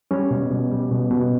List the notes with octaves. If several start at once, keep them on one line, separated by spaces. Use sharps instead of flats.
G3 C#4
B2
B2
G3
B2
B2